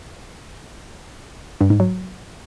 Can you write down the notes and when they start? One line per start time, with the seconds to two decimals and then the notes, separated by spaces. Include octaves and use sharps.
1.61 G2
1.70 G#2
1.80 F#3